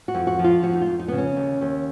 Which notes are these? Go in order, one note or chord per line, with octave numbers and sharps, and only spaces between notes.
F#4
F2
F#4
F3
F4
F2 F#4
D#4
F4
F2
D#4
C#3 B3
C#4
D#2
D#2